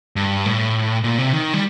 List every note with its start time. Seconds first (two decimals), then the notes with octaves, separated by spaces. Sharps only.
0.16 G2
0.46 A2
1.04 A#2
1.18 C3
1.33 D#3
1.54 G3